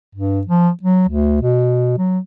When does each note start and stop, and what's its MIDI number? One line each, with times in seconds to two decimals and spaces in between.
0.15 0.42 43
0.46 0.70 53
0.82 1.07 54
1.08 1.38 38
1.42 1.97 47
1.98 2.19 54